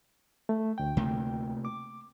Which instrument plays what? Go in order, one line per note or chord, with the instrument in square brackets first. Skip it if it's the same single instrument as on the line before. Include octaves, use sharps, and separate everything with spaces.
[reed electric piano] A3
D2 G5
[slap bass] C3 A3 A#3
[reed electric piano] D6